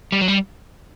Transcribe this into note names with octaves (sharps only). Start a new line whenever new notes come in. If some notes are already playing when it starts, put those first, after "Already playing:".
G3
F#3
G3